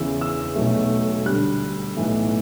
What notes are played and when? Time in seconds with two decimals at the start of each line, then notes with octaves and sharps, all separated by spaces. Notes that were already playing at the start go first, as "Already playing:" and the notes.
Already playing: E2 C#3 E3 E6
0.21 E6
0.56 B1 B2 F#3 A3
1.26 D2 D3 G3 F#6
1.97 B1 A2 E3 A3